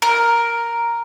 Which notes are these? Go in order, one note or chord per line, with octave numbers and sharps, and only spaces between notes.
A#4